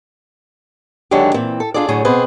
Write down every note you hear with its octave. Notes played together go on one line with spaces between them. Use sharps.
D3 D#3 F#3 G#3 D4 G4
A#2 E3 C4
A4
D4 F4 G#4 A4 D5
A2 D3 F#3 G#4
B2 C4 G#4 B4 C5